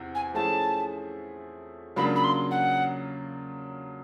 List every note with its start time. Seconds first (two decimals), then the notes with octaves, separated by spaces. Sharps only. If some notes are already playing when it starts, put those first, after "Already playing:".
Already playing: E2 C3
0.14 G#5
0.34 F3 A3 C#4 E4 G#4 A5
1.96 C#3 F#3 A#3 D4 F4 B5
2.15 B5
2.23 C6
2.50 F#5